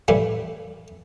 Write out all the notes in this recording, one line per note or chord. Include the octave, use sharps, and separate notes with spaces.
A2 E3 G3